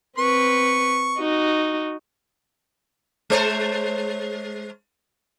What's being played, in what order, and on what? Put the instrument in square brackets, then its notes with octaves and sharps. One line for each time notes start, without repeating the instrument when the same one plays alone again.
[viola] C4 B4 [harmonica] C#6
[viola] D#4 F#4
[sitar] G#3 C5 C#5